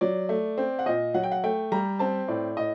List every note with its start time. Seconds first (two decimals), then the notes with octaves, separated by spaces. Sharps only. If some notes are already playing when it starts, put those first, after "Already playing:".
0.01 F#3 D5
0.29 A3
0.58 C4
0.79 F#5
0.86 A#2 D#5
1.14 F#3 F#5
1.23 G5
1.32 F#5
1.44 A3 G5
1.72 G3 A#5
1.99 C4 A5
2.28 A2 D5
2.57 A2 D#5